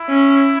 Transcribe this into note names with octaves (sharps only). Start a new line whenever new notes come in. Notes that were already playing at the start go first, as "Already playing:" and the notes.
Already playing: E4
C#4